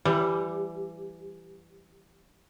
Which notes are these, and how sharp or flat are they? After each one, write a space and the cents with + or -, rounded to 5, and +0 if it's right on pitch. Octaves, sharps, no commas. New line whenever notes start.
E3 +25 G3 +0